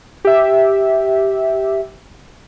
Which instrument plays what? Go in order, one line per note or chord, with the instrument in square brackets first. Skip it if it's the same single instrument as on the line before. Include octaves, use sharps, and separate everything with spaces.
[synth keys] G4 E5